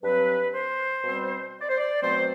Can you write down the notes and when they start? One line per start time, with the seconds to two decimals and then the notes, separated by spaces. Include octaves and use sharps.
0.02 G2 F#3 C4 B4
0.52 C5
1.02 B2 G3 C4
1.61 D5
1.69 C5
1.78 D5
2.02 B2 F#3 A3 C4 C5